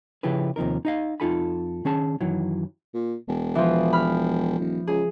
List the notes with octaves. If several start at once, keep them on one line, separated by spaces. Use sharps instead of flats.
C#3 F3 E4 G4 G#4 B4
D#2 C3 F3 D#4 A#4
D#4 D#5 F5
F2 D#4 F4 A4 G#5 B5
D#3 C#4 G#4 A5
F#2 D#3 E3 F#3
A#2
E1
E3 F3
B5 F6
D#1
C#2 G#4